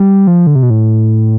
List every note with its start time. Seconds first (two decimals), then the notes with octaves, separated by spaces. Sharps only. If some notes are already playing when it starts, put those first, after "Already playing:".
Already playing: G3
0.27 F3
0.47 D3
0.55 C3
0.63 B2
0.70 A2